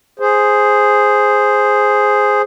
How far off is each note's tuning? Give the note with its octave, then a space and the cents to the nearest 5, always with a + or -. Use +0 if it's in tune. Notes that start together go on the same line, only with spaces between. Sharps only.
G#4 +0 C5 +0